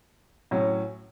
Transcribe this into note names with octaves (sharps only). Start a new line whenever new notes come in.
A2 F#3 C#4